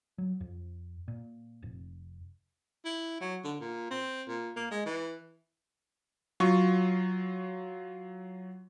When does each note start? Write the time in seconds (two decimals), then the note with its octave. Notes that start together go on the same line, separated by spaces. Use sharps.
0.18 F#3
0.41 F2
1.08 A#2
1.62 F1
2.85 E4
3.21 F#3
3.44 D3
3.60 A#2
3.90 C4
4.28 A#2
4.56 A#3
4.71 G#3
4.85 E3
6.40 F#3 F4 C#6